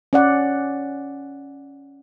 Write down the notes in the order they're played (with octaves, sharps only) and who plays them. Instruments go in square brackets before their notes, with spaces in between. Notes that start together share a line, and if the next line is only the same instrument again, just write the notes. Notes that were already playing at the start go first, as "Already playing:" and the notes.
[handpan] C#4 D5 F#5